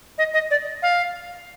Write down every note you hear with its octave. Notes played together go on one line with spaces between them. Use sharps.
D#5
D#5
D5
F5